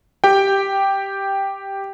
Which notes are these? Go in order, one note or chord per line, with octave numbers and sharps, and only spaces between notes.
G4 G5